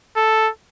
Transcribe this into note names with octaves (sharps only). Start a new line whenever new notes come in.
A4